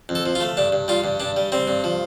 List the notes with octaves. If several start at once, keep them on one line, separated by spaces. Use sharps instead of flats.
F2
A4
F3
F4
A3
G2 D4
G2
G3 F4
G2
G2 D4
G3
G3 C4
G2
F3